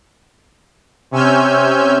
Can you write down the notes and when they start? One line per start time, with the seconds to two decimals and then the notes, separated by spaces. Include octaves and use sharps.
1.11 C3 C#4 G#5 E6 F6 G6